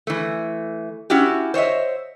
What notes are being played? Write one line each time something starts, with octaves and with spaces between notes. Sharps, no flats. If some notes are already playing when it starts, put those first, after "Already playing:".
E3 A3
C#4 E4 F#4 G4
C5 C#5 D#5 E5